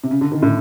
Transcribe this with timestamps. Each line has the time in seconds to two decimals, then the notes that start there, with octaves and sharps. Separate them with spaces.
0.04 C3
0.11 C#3
0.21 D3
0.32 D#3
0.42 A2